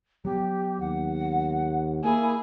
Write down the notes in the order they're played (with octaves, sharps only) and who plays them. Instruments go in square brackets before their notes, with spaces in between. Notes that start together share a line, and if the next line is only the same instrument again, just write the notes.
[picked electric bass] F#3 B3 [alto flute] G4
[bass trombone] D#2 [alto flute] F#5
[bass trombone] A#3 [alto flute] E4 [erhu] G#4